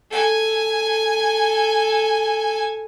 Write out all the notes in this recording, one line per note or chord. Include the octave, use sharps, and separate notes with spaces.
A4 G#5